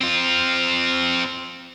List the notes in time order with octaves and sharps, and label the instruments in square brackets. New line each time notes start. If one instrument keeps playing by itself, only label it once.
[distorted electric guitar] C4 F4